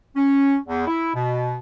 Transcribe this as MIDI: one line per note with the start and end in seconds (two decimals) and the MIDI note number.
0.16 0.56 61
0.66 0.87 40
0.87 1.13 64
1.14 1.56 47